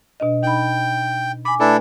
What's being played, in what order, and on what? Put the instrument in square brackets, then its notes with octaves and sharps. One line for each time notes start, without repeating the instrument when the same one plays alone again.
[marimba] B2 D4 D#5
[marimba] D#4 B5 [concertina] G5
[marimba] G#5 D6 [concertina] B5
[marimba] A3 B4 G#5 [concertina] D4 E4 A4